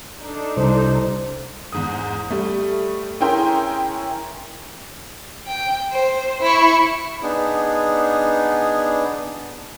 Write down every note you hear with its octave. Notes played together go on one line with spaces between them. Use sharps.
D4 D#4 A4
C2 C5
E2 G#2 D#6
G3 A3
C#4 E4 G#4 A#4 G5 C6
G5
C5
E4 C#6
B3 D4 D#4 G#4